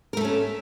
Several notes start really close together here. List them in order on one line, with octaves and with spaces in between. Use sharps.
A#4 A3 A4 C#4